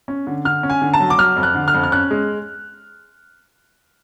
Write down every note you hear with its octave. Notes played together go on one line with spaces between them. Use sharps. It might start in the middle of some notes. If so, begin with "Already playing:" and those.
C#4
D3
D3 F6
C#4
G#5
D3
A5
F#3
D6
F#3 F6
F2
F#6
D3
F6
F2
F6
C#4 F#6
G#3